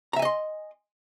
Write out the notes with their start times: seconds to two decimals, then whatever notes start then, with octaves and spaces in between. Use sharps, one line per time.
0.13 A#5
0.16 E5
0.19 G#5
0.22 D#5
0.25 C6